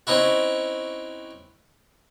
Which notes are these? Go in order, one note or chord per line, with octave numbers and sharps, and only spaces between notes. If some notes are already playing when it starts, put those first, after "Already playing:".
C4 C#4 D#4 E4 F#4